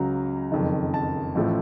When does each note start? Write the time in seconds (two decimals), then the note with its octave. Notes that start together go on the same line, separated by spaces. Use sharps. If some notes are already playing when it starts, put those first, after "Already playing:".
Already playing: C#2 C#3 F#3 A#5
0.52 F#1 F2 D#3
0.94 A5
1.35 A1 A2 F3 A3